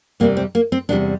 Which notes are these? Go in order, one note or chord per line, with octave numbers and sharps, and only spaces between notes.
E2 C3 G3 A#3
C4
A#3
C4
E2 C3 G3 D4